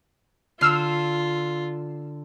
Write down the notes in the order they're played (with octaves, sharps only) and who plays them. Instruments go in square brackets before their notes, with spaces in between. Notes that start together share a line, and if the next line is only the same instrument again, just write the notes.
[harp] D3 [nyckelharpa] F4 [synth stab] E6 F6 C7